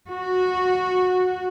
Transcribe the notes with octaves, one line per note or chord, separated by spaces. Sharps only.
F#4